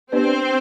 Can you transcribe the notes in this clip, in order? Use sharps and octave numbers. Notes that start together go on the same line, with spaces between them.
B3 C4 D4 G4 B4 C5 D5